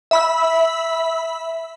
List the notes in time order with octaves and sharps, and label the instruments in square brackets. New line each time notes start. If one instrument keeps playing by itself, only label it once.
[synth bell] E5 B5 E6